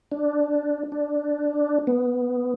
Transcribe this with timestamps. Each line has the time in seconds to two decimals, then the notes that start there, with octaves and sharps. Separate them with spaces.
0.12 D4
0.92 D4
1.87 B3